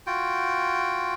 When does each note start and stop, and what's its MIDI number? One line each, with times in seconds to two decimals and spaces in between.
0.07 1.14 65
0.07 1.14 66
0.07 1.14 79